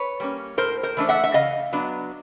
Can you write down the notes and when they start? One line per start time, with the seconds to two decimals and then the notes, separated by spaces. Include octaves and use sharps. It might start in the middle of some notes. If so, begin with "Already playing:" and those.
Already playing: B4 C#5
0.20 G3 A#3 C#4
0.57 A2 A#4 C5
0.83 A#4 C5
0.97 E3 A3 D4
1.09 E5 F#5
1.24 E5
1.34 C#3 D#5 F5
1.72 F#3 B3 D4